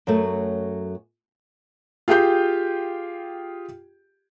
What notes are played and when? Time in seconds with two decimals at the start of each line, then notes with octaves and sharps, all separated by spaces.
0.07 F#2 F#3 A3
2.08 F4 G4 G#4 G5 G6